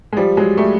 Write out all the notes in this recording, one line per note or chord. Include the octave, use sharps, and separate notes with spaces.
G#3
F3 G3
F#3 G#3
G3 A3